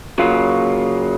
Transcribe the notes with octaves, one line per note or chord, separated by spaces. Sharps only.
C#3 F#3 A#3 F4